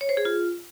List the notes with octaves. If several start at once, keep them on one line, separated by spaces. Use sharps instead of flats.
C#5
C5
G#4
F4